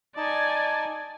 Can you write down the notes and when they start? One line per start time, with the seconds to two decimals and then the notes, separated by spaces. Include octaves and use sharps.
0.17 D#4 D5 D#5 G#5 A5